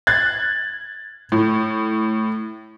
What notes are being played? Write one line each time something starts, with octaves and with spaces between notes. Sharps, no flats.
F#6 G#6 A6
A2